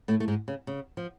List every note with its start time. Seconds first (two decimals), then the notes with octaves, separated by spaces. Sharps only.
0.08 A2 A3
0.20 A3
0.28 G#2 G#3
0.48 C#3
0.67 C#3
0.97 F3